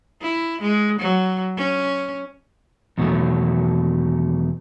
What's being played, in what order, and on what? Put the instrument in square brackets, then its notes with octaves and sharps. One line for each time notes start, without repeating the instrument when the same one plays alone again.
[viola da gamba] E4
G#3
F#3
C#4
[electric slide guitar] E2 B2 D#3 F#3 A3